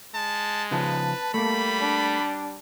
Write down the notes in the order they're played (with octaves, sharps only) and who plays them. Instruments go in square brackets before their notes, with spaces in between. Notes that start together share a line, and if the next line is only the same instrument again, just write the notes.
[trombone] G#3 [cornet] A5
[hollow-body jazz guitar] C#3 F3 [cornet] B4 [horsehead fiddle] A5
[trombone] G3 [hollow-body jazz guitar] A3 A#3 [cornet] B5
[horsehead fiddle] D4